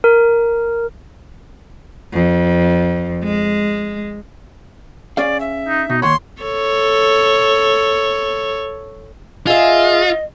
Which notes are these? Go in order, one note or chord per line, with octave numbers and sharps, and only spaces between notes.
A#4
F2
G#3
C#4 G#4 D5 F5
E5
D#4
B2 D#4
D#2 C#5 F#5 B5 C6
A4 C#5
F4 G#4 D#5 E5